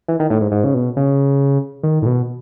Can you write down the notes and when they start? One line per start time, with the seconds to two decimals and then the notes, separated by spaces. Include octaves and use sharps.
0.08 E3
0.20 D#3
0.30 A2
0.41 G#2
0.52 G#2
0.64 C#3
0.74 B2
0.97 C#3
1.83 D#3
2.02 A2
2.06 B2